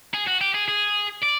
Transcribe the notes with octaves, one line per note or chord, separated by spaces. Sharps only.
G#4
F#4
G4
G#4
G#4
D5